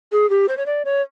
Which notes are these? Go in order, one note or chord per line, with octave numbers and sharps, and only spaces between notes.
G#4
G4
C5
C#5
D5
C#5